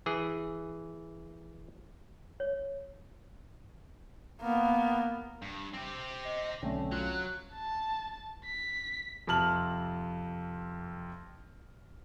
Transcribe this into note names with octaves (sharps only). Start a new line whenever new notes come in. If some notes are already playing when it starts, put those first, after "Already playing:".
E3 G#4
C#5
A#3 B3
G2
C4 G4
D#5
B1 D3 A3 C4 C#4
F#3 F4 F#6
A5
B6
F2 C3 A5 F6 F#7